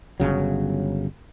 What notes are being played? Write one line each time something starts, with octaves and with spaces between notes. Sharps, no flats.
G1 C2 C#3 F#3